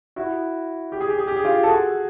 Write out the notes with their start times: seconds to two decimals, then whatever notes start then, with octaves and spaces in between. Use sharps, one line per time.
0.16 E4 F#4
0.92 G4
1.01 G#4
1.09 G4
1.18 G#4
1.27 G4
1.36 G#4
1.44 F4 G4
1.63 A4
1.68 F#4 G#4